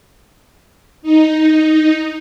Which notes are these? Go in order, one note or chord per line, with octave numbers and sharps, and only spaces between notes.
D#4